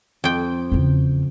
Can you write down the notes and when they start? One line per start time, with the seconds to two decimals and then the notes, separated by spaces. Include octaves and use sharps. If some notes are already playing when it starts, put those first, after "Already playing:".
0.24 F2 G5
0.72 E2 C#3